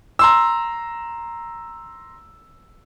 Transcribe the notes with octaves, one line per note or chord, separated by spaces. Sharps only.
A#5 C6 E6